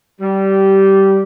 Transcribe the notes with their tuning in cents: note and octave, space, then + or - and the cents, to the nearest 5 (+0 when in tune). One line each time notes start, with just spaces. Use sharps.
G3 -15